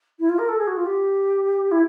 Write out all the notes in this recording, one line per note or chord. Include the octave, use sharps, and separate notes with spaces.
E4
F4
A#4
A4
G#4
F#4
F4
G4
E4